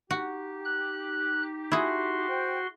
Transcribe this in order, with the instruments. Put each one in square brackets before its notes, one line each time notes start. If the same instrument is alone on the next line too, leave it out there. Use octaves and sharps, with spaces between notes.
[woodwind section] D#4 G4 [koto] F#4
[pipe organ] F#6
[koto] E4 G#4 [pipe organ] F#4 C6
[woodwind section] C5 G5